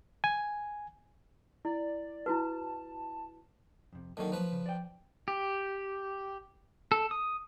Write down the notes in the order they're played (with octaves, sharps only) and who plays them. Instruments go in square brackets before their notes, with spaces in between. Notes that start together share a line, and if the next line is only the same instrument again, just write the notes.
[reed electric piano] G#5
[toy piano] E4 [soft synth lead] D5
[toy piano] E4 F#4 B4 [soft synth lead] A5
[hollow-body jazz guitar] F2 C3
[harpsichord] D3 D#3 [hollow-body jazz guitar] F#3 A#3 D#5
[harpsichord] F3 B4
[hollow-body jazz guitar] C#3
D5 G5
[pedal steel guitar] G4
A4
D#6